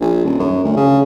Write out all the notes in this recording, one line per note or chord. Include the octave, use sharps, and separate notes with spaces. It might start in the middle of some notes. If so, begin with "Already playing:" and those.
A#1
D#1
F#2
D2
C#3